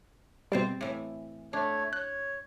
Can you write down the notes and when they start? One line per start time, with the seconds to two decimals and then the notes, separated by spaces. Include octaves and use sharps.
0.52 B2 G3 C4 C5 D5
0.81 A2 E3
1.53 A3 D4 C#5
1.93 C#5 F#6